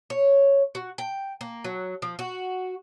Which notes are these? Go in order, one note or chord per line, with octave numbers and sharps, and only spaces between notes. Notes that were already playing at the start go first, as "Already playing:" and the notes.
C#5
F#4
G5
A#3
F#3
F3
F#4